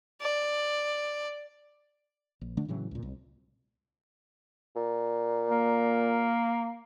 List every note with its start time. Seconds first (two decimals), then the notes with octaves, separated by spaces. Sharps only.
0.21 D5
2.41 A#1
2.57 D3 A3 D4
2.68 A2 C#3 E3 F#3
2.91 C#2 A#2
3.03 C2
4.76 A#2
5.50 A#3